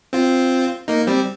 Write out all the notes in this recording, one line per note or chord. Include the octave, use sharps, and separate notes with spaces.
C4 F4
A#3 D#4
G3 C4